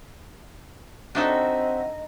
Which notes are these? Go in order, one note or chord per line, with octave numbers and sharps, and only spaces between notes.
C4 D4 D#4 F#4 A4 D#5 E5